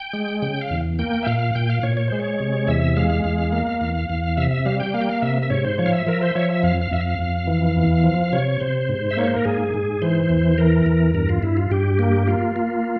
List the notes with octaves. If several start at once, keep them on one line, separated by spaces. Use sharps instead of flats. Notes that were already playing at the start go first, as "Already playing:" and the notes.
Already playing: G5
G#3
C#3 G5
F5
E2
A#3 G5
E5
A#2 F5
A#2 G5
F5
A#2 C#5
C#5
G#3 C5
C#5
C3
E2 E5
G#3 F5
E2
A#3
E2
E2
C3 E5
E5
G3 F5
G5
A#3 F5
G5
F5
C3 E5
E5
G#2 C#5
C5
F3 C#5
F5
E5
F3 A#4
C5
F3 C#5
E5
F2 F5
F5
F2 E5
F5
F2
E3
E2
F3
C3 C#5
C3 C5
G#2
E5
A#3 C#5
C5
A#4
G#2 G#4
G#2
E3 C5
E2
E3 A#4
E2
G2 A#4
F4
G2 E4
F4
G2 G4
A#3
A#3 F4
A#3